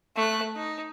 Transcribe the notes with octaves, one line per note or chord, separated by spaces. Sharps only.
A3 F#6
D#4